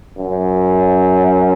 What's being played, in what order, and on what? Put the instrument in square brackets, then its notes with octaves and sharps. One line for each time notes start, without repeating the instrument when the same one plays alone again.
[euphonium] F#2